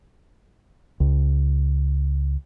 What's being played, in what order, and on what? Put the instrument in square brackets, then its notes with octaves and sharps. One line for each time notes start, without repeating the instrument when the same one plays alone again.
[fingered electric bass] C#2